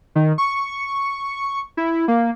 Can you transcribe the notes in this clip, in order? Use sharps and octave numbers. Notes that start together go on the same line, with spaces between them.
D#3
C#6
E4
A#3